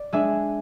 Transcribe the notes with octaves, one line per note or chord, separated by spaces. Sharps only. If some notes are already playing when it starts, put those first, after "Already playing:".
Already playing: D5
G#3 D4 E5 G#5